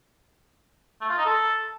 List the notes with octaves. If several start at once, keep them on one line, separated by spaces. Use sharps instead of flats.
A3
F4
D#4
A4